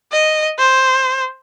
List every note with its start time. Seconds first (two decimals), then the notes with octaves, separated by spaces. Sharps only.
0.12 D#5
0.58 C5